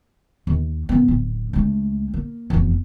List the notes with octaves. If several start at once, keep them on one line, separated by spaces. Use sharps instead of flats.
D#2
F#2 B3
D1
C#2 A3
A#3
F1 E2